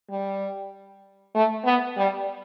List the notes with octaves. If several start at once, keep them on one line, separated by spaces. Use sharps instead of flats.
G3
A3
B3
G3